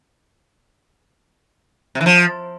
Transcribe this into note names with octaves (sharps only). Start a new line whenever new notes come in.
C3
E3
F3